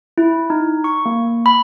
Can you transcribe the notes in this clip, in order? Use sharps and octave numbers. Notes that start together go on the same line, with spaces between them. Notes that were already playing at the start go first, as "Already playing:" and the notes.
E4
D#4
C#6
A#3
B5